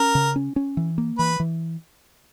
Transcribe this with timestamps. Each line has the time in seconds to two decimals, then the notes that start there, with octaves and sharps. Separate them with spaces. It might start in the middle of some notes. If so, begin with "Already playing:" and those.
Already playing: C#4 A#4
0.15 C#3
0.36 C#4
0.56 C#4
0.77 E3
0.98 A#3
1.19 E3 B4
1.40 E3